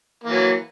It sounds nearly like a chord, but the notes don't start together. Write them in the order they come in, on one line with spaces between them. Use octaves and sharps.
A#3 E3 F#3